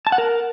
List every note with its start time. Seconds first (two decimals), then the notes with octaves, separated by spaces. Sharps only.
0.07 A5
0.12 F#5
0.18 A#4